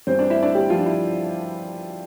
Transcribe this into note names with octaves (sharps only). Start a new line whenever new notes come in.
G2 E3 G3 C4 C5
D4 D5
E4 E5
D4 D5
G3 G4
F3 F4
D4
E4